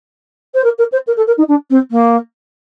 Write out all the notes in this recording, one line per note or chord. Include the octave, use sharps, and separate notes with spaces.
C5
A#4
A#4
C5
A#4
A4
A#4
D#4
D4
C4
A#3